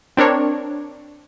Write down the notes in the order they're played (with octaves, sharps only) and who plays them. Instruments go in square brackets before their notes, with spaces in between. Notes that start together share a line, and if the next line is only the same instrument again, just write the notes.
[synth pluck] C4 D4 A#4 C#5